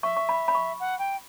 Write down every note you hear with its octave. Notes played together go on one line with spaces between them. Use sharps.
E5 C#6
C#6
B5
B5
C#6
F#5
G5